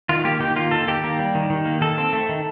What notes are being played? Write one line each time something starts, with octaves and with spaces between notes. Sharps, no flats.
D#3 F4
A#3 G4
D#3 G4
A#3 F4
D#3 A4
D#3 G4
A#3
G3
D#3
D#3
A#3
D#3 A4
C4
A3
D#3